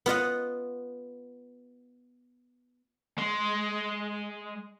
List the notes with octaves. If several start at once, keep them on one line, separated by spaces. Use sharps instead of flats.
B3 F4 D#5 F#5
G#3 C6